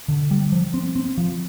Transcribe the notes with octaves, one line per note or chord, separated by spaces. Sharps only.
D3
G3
F3
C4
C4
F3